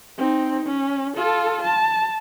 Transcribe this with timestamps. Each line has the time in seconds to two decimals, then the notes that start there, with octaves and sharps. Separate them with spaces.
0.18 C4 D#4
0.66 C#4
1.16 F4 A4
1.63 A5